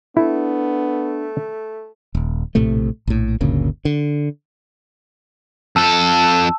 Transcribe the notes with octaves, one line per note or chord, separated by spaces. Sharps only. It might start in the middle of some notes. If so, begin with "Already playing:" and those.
A3 B3 D4 E4
D#1
A#1 A2 C3 A3
A#1 A2
G1 D2 A#2 C#3
D3
F2 A4 A5 E6